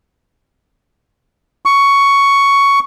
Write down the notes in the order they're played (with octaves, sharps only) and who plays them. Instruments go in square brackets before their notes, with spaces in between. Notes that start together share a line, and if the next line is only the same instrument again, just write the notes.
[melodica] C#6